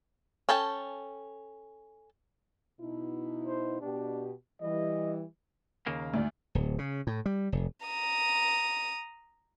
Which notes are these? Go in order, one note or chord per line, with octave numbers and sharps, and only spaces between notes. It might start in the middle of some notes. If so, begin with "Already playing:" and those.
C#4 A4 G5 A5
B2 D#4 E4
C5
B2 D4 G4
E3 G3 D#5
D#2 C#3 A#3
D2 G#2 D5
D1
C#3
A2
G3
F1
A#5 D#6